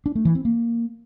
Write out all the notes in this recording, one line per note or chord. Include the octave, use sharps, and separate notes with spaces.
D4
A3
E3
C4
A#3